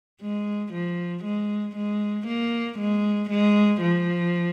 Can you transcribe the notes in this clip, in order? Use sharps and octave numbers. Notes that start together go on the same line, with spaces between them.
G#3
F3
G#3
G#3
A#3
G#3
G#3
F3